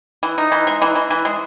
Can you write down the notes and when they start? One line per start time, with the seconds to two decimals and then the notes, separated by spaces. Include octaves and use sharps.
0.23 E3
0.38 D#4
0.52 E3
0.67 G#3
0.82 E3
0.95 E3
1.10 E3
1.25 G#3